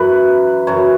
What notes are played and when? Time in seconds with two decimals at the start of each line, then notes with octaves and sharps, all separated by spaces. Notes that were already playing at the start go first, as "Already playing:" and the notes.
Already playing: F#2 E3 B4
0.67 F#2 C#3 E3 C#5